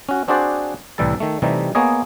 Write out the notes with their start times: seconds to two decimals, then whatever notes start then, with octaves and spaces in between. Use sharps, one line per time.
0.09 C#4 F#4
0.28 C4 D4 F#4 G#4 C5 D5
0.98 C2 A2 E3 G3 A4 A5
1.20 D#3 A3
1.42 C3 E3 G3 A3 D#4
1.75 A#3 B3 G#4 C#5 D#5